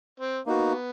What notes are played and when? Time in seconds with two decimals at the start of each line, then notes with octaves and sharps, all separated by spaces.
0.20 C4
0.45 A#3 B3 D#4 F#4